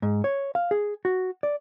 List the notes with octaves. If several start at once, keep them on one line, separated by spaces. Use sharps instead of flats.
G#2
C#5
F5
G#4
F#4
D5